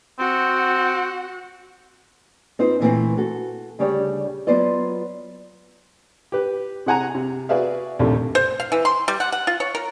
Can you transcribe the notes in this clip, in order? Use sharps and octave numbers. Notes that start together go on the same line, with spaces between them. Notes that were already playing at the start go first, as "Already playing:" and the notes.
C4 F#4 F#5
C4 D#4 F4 B4 C5
A#2 E3 A3 C4
F#4 A4
D2 C#3 G3 G4 C#5 D5
F#3 B3 F4 C5 D5 D#5
G4 B4
C3 G#4 F#5 G#5 A#5
C3
F#4 G#4 B4 D5 E5 F5
A#1 D#2 C3 A3
C5
F5
E3
C6
G3
F#5
F#5
F4
C#5
A#4